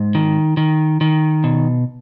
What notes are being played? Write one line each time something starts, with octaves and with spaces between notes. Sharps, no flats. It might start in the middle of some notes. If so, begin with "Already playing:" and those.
Already playing: G#2
D#3
D#3
D#3
B2